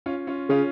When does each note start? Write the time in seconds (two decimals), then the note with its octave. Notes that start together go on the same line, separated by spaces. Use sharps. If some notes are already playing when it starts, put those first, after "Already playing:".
0.06 C#4 F4
0.27 C#4 F4
0.49 C#3 C#4 F4